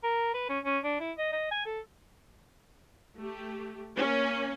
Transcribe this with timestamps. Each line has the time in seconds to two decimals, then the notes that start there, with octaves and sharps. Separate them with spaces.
0.03 A#4
0.34 B4
0.49 C#4
0.64 C#4
0.83 D4
1.00 E4
1.18 D#5
1.32 D#5
1.51 G#5
1.65 A4
3.18 A3 G4
3.97 A#3 C#4